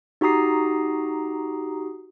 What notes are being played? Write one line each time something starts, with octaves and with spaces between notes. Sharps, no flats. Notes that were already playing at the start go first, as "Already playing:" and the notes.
D#4 F#4 G4 A#5 D#6 C7